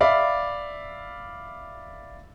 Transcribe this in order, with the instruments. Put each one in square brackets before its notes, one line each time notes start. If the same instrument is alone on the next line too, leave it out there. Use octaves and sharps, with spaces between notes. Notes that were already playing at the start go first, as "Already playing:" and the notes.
[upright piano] D5 E5 F5 B5